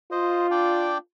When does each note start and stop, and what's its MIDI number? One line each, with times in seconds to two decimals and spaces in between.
0.11 0.98 65
0.11 0.47 72
0.11 0.47 75
0.51 0.98 62
0.51 0.98 74
0.51 0.98 79